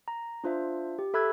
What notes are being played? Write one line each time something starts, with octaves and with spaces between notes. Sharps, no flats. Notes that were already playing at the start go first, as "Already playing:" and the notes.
A#5
D4 F4 C5 E5
G4
A4 E5 B5 E6 F#6 G#6